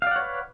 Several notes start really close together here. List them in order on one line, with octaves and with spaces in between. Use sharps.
F5 D5 F#5 C#5 B4